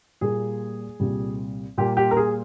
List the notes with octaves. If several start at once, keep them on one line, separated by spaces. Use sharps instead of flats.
A#2 G3 A#3 G#4
C2 A#2 G3
A#2 G3 A#3 G4
G4
A#4
G#4